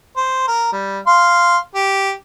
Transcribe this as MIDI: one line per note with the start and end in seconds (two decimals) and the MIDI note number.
0.16 0.44 72
0.48 0.69 70
0.72 0.99 55
1.07 1.58 77
1.07 1.58 84
1.75 2.11 67